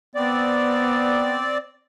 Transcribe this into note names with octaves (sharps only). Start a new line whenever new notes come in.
B3 C4 D5